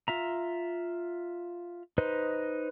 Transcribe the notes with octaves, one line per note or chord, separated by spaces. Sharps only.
F4 E5 A#5
D#4 B4 C5 D#5